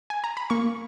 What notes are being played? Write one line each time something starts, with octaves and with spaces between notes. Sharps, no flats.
G#5
A#5
B5
A#3 C#6